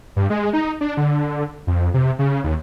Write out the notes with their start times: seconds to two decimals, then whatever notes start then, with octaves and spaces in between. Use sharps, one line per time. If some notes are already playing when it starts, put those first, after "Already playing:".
0.16 G2
0.30 G#3
0.53 D#4
0.81 D4
0.97 D3
1.67 F2
1.94 C3
2.19 C#3
2.44 D#2